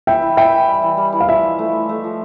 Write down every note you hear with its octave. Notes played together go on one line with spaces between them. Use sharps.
E3 E5 G5
E3
E3 E5 G5
E3
G3
E3
G3
E3
F5
F3 E5
E4
A3
F3
A3
F3